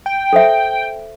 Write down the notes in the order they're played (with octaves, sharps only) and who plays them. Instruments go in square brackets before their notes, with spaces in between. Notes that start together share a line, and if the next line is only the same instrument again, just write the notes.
[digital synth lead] G5
[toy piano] A4 C5 E5